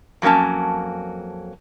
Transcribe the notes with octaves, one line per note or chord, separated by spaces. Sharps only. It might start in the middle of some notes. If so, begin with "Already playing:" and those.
F2 F#3 A#3 C#4 A5